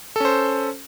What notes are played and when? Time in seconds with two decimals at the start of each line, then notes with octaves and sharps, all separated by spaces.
0.16 A4
0.20 C#4
0.25 C5